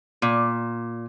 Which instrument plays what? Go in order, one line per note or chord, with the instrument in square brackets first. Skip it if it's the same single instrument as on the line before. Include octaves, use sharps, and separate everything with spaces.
[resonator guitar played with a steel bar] A#2